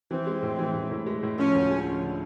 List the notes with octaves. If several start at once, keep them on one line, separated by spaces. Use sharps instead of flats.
E3 C4
G#3
A2
E3
A2
A2
G#3
A2
F3 C#4
D2
G#3
F3
D3